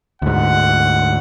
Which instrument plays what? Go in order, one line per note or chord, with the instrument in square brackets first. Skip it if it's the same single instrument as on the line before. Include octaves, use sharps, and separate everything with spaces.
[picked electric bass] D2 G#2 [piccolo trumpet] F#5